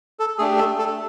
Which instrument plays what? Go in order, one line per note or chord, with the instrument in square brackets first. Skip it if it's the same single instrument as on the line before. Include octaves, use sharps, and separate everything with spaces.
[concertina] A4
A3 D4 G4 G#4
A4
A4